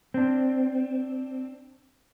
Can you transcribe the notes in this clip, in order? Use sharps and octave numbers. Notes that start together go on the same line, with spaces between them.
C4 D4